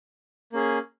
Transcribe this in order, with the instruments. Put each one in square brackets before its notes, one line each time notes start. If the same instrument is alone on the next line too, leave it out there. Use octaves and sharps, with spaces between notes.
[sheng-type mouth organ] A#3 C#4 G#4